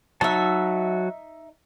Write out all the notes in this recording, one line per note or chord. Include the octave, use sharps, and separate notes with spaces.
F#3 D#4 F#4 E5 A5